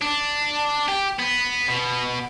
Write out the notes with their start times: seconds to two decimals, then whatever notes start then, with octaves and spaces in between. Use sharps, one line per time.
0.02 D4
0.89 G4
1.19 B3
1.68 B2